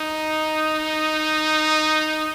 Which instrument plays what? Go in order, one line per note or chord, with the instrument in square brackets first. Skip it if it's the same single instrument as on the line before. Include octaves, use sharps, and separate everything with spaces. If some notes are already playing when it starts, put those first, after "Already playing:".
Already playing: [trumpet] D#4